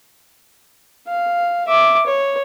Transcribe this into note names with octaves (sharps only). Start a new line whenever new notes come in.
F5
E5 D6
C#5